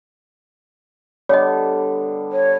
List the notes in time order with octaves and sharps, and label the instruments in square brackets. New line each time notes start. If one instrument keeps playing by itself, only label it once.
[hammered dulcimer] D3 G3 B3 [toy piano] C#5 D#5
[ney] C#5